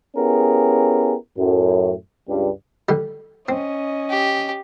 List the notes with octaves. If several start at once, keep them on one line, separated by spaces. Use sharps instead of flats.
B3 C#4 E4 G4 G#4 A#4
F#2 A2
C#2 G2 G3
D3 G3
C4 C#4 D#5
G4